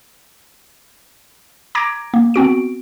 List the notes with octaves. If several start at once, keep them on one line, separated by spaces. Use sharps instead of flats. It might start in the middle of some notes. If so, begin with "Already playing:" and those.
A#5 D6 G#6 A#6 D7
A#3
B3 C4 F#4 D7